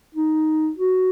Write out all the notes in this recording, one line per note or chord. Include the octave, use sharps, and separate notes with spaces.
D#4
F#4